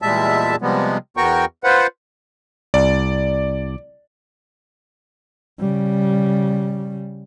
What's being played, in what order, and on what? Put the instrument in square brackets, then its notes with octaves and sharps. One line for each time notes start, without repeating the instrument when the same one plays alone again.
[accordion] E2 A#2 G3 G#3 E5 A5
C3 F3 G3 G#3 B3
E2 B3 F#4 A#4 G5 C#6
F4 B4 C5 F#5
[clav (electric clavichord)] C2 [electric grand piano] D5
[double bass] C#3 G3